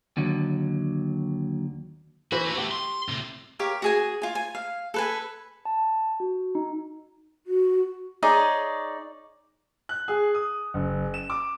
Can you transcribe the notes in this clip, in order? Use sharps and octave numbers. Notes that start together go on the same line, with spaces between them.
D#2 D3 F#3
E3 E4 F#4 C5
A3 F#4
G4 G5
C6
A2 C3
G4 A#4 C#5 F5
F#4 G#4 G#5
F4 G#5
G#5
F5
A4 B4 G#5
A5
F#4
D#4
F#4
D#4 G#4 C#5 D5
F#6
G#4
D#6
F#1
E7
D6